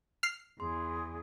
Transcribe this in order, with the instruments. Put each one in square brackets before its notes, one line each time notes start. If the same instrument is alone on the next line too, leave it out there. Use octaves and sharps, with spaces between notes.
[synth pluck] F6 C7
[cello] E2 [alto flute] G#4 [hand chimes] C6